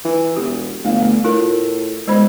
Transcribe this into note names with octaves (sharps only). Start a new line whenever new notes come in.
E3
E1 G4
G1 A3 F5
A3
A2 F4 A#4
E1 G#3 C5 B5